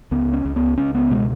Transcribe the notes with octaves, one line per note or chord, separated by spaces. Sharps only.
C#2 B3
C#4
C#2
B3
C#2 C#4
B3
B2 G#3